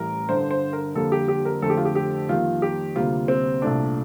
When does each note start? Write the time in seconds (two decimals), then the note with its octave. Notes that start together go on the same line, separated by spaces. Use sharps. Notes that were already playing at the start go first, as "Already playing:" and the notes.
Already playing: A1 A2 G3 A#4
0.29 G1 G2 D3 C5
0.51 C5
0.73 A#4
0.95 F2 D3 G3 A#3 A4
1.12 G4
1.28 G4
1.45 A#4
1.62 F2 D3 A3 A4
1.70 G4
1.77 F4
1.85 G4
1.95 G4
2.29 F2 D#3 G3 A#3 F4
2.62 G4
2.95 D2 C3 G3 A#3 F4
3.28 C4
3.62 C2 A#2 A3 D4